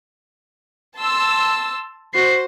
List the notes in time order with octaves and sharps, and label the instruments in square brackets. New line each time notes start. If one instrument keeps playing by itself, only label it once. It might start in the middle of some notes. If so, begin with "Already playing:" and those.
[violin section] A5 C6 E6
[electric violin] F#4 C7 [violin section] C5